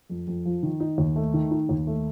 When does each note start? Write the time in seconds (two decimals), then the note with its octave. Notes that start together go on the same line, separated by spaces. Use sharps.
0.10 F2
0.27 F2
0.45 F3
0.63 D#3
0.80 D#4
0.98 D#2
1.16 A3
1.34 D#3
1.51 D#4
1.69 D#2
1.87 A3